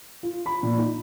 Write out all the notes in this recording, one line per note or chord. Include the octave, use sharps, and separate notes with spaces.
F4
B5
A#2
D#4